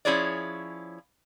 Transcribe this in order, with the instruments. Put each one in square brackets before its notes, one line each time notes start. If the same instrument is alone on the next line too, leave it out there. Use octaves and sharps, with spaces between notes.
[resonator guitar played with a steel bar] F3 C#4 E4 G#4 C#5 D5